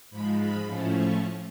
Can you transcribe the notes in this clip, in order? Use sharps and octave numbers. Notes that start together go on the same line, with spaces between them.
G#2 F3 G#3 B5
B5
A2 F3 A3 C#4
C#6